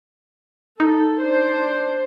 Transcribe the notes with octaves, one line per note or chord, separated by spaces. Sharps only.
D#4 A4
D4 C5